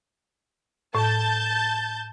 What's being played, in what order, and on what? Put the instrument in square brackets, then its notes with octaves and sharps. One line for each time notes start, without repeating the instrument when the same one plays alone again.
[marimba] A2 [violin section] A5 G6 A6